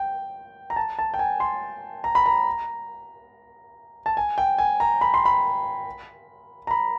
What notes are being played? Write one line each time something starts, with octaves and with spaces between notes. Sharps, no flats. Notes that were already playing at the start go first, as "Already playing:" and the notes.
Already playing: G5
A#5
A5
A5
G5
G#5
C6
A#5
B5
A#5
A5
G#5
G5
G#5
A#5
B5
C6
B5
A#5
B5